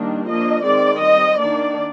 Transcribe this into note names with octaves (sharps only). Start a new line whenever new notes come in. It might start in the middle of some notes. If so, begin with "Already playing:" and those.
Already playing: D#3 G3 A#3 D4
F3 A#3 D4 D#5
D#3 G#3 C4 D5
G3 C4 D#5
D#3 A#3 D4 D5